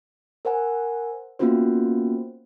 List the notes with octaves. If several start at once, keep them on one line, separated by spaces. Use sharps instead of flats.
A#4 C5 F#5 G#5
A#3 B3 C#4 F4 F#4 C5